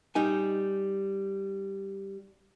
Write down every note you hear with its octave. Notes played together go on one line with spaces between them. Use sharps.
G3 D#4 G#5